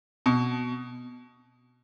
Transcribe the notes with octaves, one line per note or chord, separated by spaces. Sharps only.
B2